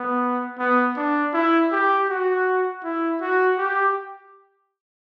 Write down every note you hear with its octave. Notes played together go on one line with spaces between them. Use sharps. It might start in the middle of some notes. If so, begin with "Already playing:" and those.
Already playing: B3
B3
D4
E4
G4
F#4
E4
F#4
G4